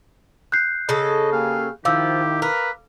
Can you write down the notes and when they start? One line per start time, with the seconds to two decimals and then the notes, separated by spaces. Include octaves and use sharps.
0.52 F#6 G6 C7
0.89 C#3 A4 D#5
1.33 A#3 G4 G#4 F5
1.85 D#3 F3 E4 G4 F5 D6 E6
2.42 A#4 B4